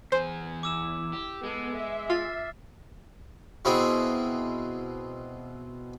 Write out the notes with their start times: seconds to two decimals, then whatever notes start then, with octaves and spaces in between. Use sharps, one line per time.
0.12 E2 G#4 C5
0.63 E4 D6 E6 E7
1.13 G4
1.43 G#3 B3 A4
1.75 E5
2.10 F4 F6 A6 C7
3.65 B2 C4 E4 G#4